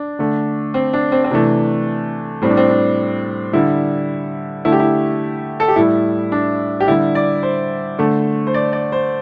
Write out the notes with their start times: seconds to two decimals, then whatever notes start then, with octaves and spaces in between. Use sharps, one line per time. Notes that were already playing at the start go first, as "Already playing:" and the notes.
Already playing: D4
0.19 D3 A3
0.74 C4
0.93 D4
1.12 C4
1.24 C4
1.31 C3 E3 A3 D4
2.42 A2 G3 C4
2.50 D4
2.57 C4
2.69 D4
3.53 D3 G3 E4
4.65 D3 A3 E4
4.72 G4
4.79 E4
5.60 A4
5.68 G4
5.76 A2 G3 E4
6.32 D4
6.80 G4
6.88 D3 G3 E4
7.15 D5
7.43 C5
7.98 D3 A3
8.47 C5
8.54 D5
8.73 D5
8.92 C5